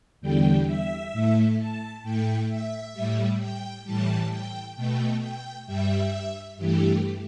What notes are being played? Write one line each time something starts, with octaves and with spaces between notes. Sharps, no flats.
E2 D3 G3 G5
E5
A2 A3
A5
A2 A3 G5
E5
A2 G3
G5
A2 E3 G3 A5
G5
B2 A3 G5
G5
G2 G3 E5
G2 E3 A3 G4